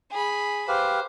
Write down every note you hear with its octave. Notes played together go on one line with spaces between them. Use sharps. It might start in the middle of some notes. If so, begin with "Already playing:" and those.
G#4 B5
G4 B4 C5 F5